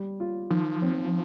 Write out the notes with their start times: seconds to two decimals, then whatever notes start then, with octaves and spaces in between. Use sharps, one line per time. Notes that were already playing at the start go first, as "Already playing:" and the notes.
Already playing: G3
0.20 F4
0.50 D#3 F3
0.82 C4